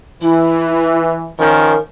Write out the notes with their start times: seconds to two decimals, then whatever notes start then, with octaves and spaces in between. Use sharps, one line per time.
0.22 E3 E4
1.39 D#3 F3 C#4 A#4